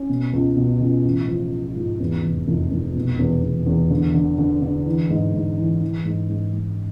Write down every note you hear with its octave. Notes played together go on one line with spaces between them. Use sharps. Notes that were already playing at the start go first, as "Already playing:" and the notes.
Already playing: C#4
B2
C#2
B2
C#2
A1
F3
F3
G#2
E2
F1
F1
F1
B2
E2
E2
E2
D3
D3
D3
D3
E3
G#2
G#2
E3
E3
G#2
G#2
G#2